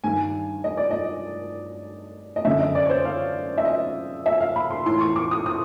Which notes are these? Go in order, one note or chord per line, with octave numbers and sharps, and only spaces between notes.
G2 D#3 G#5
D#5
D5
D#5
D#5
F#2 D3 E5
D#5
D5
C#5
C5
F5
E5
D#5
E5
F5
B5
C6
A2 E3 C6
C#6
D6
D#6
D#6